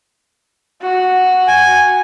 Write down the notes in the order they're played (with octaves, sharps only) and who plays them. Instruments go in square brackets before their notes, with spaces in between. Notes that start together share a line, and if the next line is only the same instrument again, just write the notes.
[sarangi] F#4
[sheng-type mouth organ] G#5